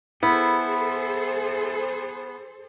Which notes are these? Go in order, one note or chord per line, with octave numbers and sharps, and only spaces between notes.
B3 E4 G#4 A4 C5